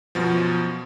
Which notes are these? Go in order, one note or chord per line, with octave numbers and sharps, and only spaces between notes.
F#2 B2 F3